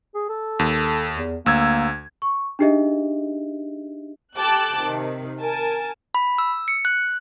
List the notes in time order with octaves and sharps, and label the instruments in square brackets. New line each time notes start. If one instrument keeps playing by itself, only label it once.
[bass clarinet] G#4
A4
[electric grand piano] D#2
[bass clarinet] E2
[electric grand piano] D2 E6 G#6 [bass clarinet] A#3
[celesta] C#6
D4 D#4 G4 G#4 D#5 E5
[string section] G4 A4 G5 A5 D6 F#6
C3 D#3
A#4 G#5 A5
[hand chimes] B5
E6
C#7
F#6